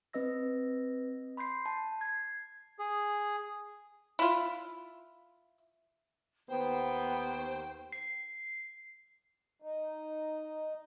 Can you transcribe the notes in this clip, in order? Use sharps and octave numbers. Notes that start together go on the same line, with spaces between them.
C4 B4 D#5 E6 A#6
B5 C6 G6 C7
A5
G#6 C7
G#4
E4 F4
D#2 B3 C5 G5
C7
D#4